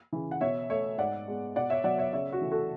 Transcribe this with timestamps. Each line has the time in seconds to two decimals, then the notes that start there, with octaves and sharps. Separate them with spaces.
0.12 C#3 E3
0.31 F#5
0.41 B2 C#5 E5
0.70 A3 C#5 E5
0.98 G#2 D5 F#5
1.28 G#3 B3
1.56 B2 D5 F#5
1.70 C#5 E5
1.84 F#3 B3 D5 F#5
1.98 C#5 E5
2.13 C#3 C#5 E5
2.33 F#4
2.42 E3 A3
2.52 F#4 A4